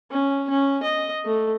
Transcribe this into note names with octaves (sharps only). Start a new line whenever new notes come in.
C#4
C#4
D#5
A3